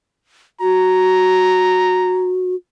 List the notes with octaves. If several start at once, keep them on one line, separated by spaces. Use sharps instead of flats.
F#4 A#5